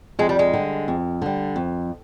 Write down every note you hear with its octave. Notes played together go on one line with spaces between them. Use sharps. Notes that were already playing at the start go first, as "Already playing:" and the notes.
F2 G#3
G3
G#3
D3 G3
F2
D3 G3
F2